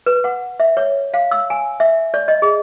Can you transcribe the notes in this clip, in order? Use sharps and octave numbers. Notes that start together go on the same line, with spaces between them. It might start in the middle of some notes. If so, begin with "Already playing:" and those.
B4
F#5
E5
C#5
F5
E6
G#5
E5
D5
D#5
G#4